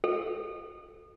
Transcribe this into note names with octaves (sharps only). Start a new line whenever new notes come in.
A4